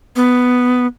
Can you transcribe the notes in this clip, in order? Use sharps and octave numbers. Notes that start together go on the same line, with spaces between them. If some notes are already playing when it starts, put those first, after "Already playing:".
B3